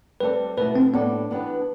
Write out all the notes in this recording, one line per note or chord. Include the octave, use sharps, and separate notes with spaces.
G3 C4 F4 A4 B4 D5
B2 A3 E4 B4
C4
A2 G3 B3 D4 A4 D5
E3 B3 D4 G4 B4